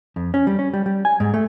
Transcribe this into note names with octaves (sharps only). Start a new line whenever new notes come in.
F2
C#4
G3
C#4
G3
G3
G#5
G#2
A3